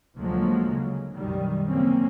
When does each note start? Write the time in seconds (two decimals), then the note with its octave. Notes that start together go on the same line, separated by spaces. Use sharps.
0.18 D2 F3 F#3 G#3 A#3
0.73 C#3
1.15 B1 F#2 D#3 F#3 G3
1.68 C#3 A#3 C4 C#4